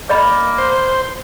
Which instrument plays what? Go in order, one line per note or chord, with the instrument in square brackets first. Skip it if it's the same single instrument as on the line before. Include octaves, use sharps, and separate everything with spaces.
[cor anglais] A#3 [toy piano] D5 D#5 B5
[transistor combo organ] C5